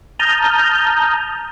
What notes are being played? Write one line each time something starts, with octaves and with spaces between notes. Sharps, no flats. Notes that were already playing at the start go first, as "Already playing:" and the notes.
A5 A#5 D#6 F6 G6